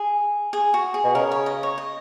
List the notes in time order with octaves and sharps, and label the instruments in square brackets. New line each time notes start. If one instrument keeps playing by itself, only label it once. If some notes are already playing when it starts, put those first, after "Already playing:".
Already playing: [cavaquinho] G#4
G#4
F#4
G#4
[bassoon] B2
[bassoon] C#3 [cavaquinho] A#4
[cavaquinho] C#5
D#5
C#5
D#5